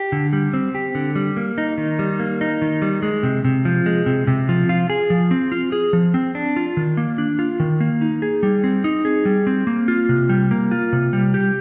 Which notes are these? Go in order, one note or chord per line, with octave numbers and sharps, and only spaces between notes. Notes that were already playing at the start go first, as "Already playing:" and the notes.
Already playing: G4
D3
G3
C4
G4
D3
G3
A#3
D#4
D#3
G3
A#3
D#4
D#3
G3
G#3
C3
C3
F3
G#3
C3
C3
F3
F4
G#4
F3
C4
F4
G#4
F3
C4
D4
F4
D#3
A#3
D4
F4
D#3
A#3
D#4
G#4
G3
C4
D#4
G#4
G3
C4
A#3
F4
C3
G3
A#3
F4
C3
G3
G4